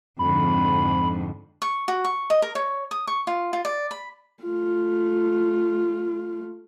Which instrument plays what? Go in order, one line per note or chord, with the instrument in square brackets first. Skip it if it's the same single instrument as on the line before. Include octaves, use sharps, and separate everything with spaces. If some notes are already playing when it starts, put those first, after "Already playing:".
[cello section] F2 G#2 D3 [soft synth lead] B5
[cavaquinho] C#6
F#4
C#6
D#5
A#4
C#5
D#6
C#6
F4
F4
D5
B5
[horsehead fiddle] A3 F4